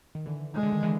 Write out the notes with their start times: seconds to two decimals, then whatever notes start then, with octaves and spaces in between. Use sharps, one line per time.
0.15 D#3
0.26 D3 E3
0.54 G#3
0.63 D3
0.73 D#3
0.83 D3 E3